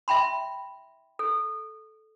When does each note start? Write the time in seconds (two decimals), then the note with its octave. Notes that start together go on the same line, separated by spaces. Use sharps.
0.08 E5 G5 B5 C6
1.19 A4